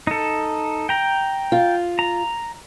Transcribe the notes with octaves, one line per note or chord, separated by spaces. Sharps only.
D#4 A4
G5 A#5
F4
A#5